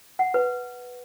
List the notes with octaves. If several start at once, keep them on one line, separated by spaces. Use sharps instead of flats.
F#5
B4